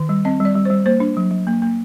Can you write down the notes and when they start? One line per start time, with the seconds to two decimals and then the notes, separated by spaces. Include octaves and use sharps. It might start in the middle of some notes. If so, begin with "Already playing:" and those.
Already playing: D#3
0.09 G3
0.25 C4 D#5
0.40 G3 D5
0.55 G3
0.65 G3 C5
0.86 A#3 C5
1.00 D4
1.17 F#3
1.31 F#3
1.47 A#3
1.62 A#3